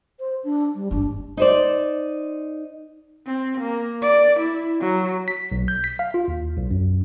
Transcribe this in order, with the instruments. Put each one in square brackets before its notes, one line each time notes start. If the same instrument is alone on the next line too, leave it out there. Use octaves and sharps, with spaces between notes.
[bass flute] C5
D4
G3
[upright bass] G1 G#2 [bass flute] D4
[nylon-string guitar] D#4 C5 D5
[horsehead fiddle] C4
A#3
D5
E4
F#3
[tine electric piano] B6
B1
G6
B6
F5
F4
D#2
B1
F#2